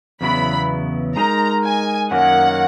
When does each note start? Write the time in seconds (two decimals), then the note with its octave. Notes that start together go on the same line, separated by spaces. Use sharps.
0.21 E2 C#3 F#3 B3 E4 B5
1.16 G#3 D#4 A#4 A#5
1.63 G#5
2.11 F#2 D#3 F#3 A#3 C#4 F#5